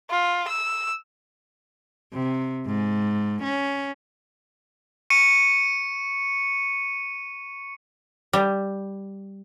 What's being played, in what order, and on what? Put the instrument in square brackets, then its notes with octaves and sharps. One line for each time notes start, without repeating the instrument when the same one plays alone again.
[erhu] F4
E6
[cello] C3
G#2
C#4
[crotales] C#6 C#7 D#7
[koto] G3